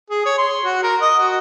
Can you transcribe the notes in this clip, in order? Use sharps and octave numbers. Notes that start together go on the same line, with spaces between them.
G#4
C#5
C6
F#4
A#4
D#5
F#4